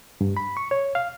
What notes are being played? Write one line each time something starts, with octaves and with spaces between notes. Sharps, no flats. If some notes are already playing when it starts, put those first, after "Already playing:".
G2
B5
C#6
C#5
F5